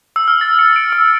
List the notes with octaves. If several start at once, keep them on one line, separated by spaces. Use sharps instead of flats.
E6
F6
A6
C#7
D7
E6